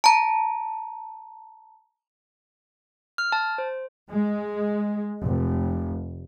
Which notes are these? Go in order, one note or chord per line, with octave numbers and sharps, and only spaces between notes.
A5 A#5
F6
A5
C5
G#3
F1